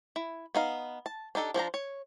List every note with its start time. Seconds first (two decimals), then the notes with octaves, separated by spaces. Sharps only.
0.16 E4
0.55 B3 D#4 F5
1.06 A5
1.35 D4 D#4 G4 A4
1.54 F3 D4 C5 A#5
1.74 C#5